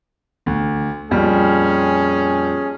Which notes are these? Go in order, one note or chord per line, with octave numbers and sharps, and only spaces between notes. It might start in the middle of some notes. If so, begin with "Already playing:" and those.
D2
F2 A#2 G3 C#4 G#4